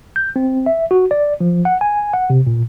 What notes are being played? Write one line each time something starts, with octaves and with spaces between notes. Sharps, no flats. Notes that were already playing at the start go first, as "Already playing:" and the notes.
G6
C4
E5
F#4
D5
F3
F#5
G#5
F#5
C3
A#2